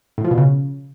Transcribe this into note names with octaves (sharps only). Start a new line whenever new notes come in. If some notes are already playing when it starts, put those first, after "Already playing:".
A2
F3
B2
C#3